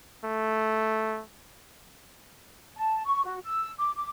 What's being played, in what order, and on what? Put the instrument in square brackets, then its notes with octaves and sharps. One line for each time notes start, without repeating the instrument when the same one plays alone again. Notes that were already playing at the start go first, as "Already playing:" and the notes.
[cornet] A3
[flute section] A5
C#6
F#4
E6
D6
D6